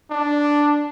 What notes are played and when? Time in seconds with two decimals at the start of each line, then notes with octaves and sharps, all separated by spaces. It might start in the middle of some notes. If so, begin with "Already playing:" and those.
0.11 D4